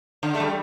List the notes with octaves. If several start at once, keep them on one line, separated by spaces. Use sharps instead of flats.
D3
A3
G3